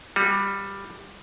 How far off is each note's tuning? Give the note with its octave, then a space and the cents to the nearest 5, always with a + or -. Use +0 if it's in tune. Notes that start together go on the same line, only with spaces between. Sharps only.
G3 +10 F#4 -35